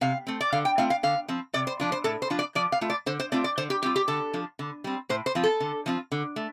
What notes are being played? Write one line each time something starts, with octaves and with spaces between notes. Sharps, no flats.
C3 F5
A3 C4
D5
D3 F5
G5
A3 C4 F4 F5
F5
D3 F5
F3 C4
C3 D5
C5
F3 D4 F4
C5
A2 A4
C5
F3 D4 F4
D5
F3 D5
F5
A3 F4
D5
D3 C5
C5
A3 C4 F4 D5
D5
D3 C5
G4
G3 C4 F4 G4
G4
D3 A4
F3 D4
D3
G3 C4
A2 C5
C5
F3 C4 F4
A4
D3
F3 C4 F4
D3
A3